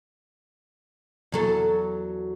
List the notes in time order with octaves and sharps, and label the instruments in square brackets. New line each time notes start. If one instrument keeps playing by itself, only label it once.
[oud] E2 F#3 A4